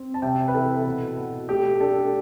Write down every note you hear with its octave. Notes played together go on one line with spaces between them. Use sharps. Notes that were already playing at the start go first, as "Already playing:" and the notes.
Already playing: C4
A5
C3 E5 G5
B4
E3 A4
B2
B2
A3 G4
D4 A4